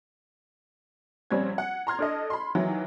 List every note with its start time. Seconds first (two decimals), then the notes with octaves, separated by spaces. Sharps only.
1.31 A#1 G3 C4 C#4 G#6
1.58 F#5
1.87 A#5 C6 F6 G#6
1.99 D4 A4 D#5
2.30 B5 C6
2.55 D#3 E3 F#3 E4